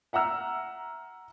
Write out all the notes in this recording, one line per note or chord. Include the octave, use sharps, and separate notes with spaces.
E5 F#5 A#5 E6 F6